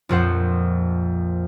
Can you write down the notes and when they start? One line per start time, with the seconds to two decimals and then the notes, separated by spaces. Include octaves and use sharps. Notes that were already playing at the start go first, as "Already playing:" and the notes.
0.09 A#1 F2 C5 F#5